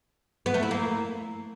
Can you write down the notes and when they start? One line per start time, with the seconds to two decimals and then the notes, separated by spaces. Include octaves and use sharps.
0.46 B3
0.54 A3
0.63 E4
0.71 A#3